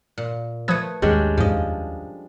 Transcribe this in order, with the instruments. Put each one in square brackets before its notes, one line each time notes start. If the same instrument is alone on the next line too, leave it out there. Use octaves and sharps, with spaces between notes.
[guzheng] A#2
[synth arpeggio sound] F3 D#6 G#6 [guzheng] A3 B4
[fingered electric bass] G#1 D#2 D#3 [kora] G3 G#3 D4 [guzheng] C#4
[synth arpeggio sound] F2 G#2 [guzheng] F3 D#5